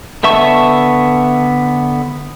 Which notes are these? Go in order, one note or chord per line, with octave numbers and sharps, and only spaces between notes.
D3 B3 E5 A5 C#6